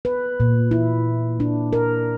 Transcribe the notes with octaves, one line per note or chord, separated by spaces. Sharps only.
B4
A#2
E4
D4
A#4